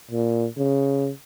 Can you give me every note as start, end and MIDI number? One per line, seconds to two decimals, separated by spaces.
0.11 0.47 46
0.57 1.10 49